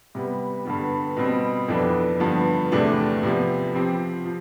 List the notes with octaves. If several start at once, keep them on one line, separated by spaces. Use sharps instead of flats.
C3 G3 B3
G2 D3 G3 B3
B2 G3 C4
F2 E3 B3 D4 A4
G2 D3 F3 B3
E2 C3 E3 A3 D4
C3 F3 B3
F3 C4 G4
F3